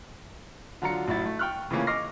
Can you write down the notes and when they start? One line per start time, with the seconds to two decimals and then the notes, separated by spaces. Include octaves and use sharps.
0.82 D3 F#3 F4 A#5 C#7
1.08 A1 F#3 E4 A6
1.26 A3
1.39 G5 C#6 F6 F#6
1.71 C#3 E3 F3 A3 A#3 C#4
1.87 D#5 C#6 D6 F6 A#6 C7